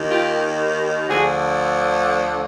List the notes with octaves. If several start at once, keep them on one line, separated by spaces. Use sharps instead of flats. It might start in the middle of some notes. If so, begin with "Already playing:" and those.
Already playing: D#2 D#3
F4 G4
D2 D3 F3 F#4 G#4